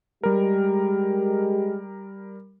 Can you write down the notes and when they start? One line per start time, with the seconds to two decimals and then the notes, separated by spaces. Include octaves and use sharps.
0.23 G3 G#3 G4 A#4